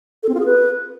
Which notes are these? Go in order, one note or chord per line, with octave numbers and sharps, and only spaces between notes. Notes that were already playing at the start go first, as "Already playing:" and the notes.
A4
C4
F4
G#4
B4